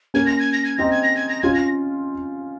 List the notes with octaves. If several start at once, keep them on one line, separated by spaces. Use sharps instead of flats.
A#3 C#4 G#6
A#6
G#6
A#6
G#6
C4 D#4 A#6
G#6
A#6
G#6
A#6
C#4 F4 G#6
A#6